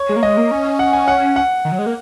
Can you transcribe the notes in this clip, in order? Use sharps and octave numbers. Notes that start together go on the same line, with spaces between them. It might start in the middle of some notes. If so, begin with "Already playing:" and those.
Already playing: C#5
G#3
A#3
G#3 D#5
A#3
C#4
F#5
G#5
F#5
F#5
D#3
F#3
G#3
A#3